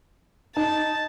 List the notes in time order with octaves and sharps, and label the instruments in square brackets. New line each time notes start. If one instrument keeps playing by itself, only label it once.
[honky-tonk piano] D#4 [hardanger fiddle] A5